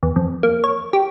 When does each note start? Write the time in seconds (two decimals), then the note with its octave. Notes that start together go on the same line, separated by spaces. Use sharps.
0.03 E2
0.16 F2
0.43 A#3
0.64 C#5
0.93 G4